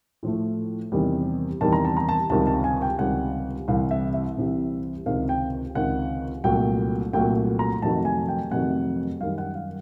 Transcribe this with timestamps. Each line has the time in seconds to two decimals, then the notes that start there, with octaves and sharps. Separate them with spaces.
0.23 A2 F3 A3
0.92 E2 C3 D#3 G3
1.61 E2 C3 D#3 G3 A5
1.73 A#5
1.85 A5
1.97 A#5
2.09 A5
2.30 C#2 C3 D#3 G3 A5
2.47 A5
2.64 G#5
2.82 G5
2.99 C#2 C3 D#3 G3 F#5
3.68 C2 C3 E3 G3 F5
3.91 E5
4.14 E5
4.37 C2 C3 E3 G3
5.06 C#2 C3 D#3 F5
5.29 G5
5.75 C#2 C3 D#3 F#5
6.44 C2 A#2 F#3 A3 G5
7.13 C2 A#2 F#3 A3 G5
7.59 A#5
7.82 F2 C3 D#3 F#3 A3 A5
8.05 G#5
8.28 G5
8.51 F2 C3 D#3 F#3 A3 F#5
9.21 F#2 D#3 G3 F5
9.38 F#5
9.55 F5